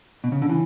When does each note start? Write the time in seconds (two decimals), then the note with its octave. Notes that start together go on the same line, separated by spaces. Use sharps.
0.24 B2
0.32 C#3
0.42 D3
0.50 E3